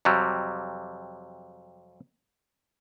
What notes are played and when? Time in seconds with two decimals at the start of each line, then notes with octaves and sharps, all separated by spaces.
0.05 F2 C3 F#3 G3